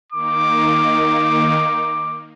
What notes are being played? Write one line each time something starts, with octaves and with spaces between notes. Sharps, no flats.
D#3 A#3 D#4 D6